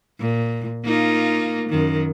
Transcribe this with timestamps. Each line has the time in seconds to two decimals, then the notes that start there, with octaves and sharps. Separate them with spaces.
0.20 A#2
0.85 A#3 D#4 F4
1.70 F#2 D#3